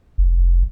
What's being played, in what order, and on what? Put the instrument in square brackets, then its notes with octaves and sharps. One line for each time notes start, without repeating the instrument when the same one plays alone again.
[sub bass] F1